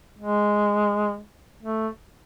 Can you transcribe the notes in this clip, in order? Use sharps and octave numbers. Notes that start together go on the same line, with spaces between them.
G#3
A3